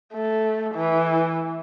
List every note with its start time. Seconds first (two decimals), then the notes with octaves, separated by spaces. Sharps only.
0.14 A3
0.75 E3